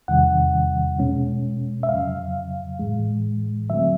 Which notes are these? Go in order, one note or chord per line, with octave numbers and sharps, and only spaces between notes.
E2 C3 D#3 G3 F#5
B2 G#3 C#4
E5
F2 C#3 F#3 F5
A2 E3 G#3
D3 F#3 A3 C4 E5